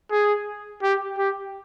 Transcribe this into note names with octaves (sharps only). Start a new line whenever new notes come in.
G#4
G4
G4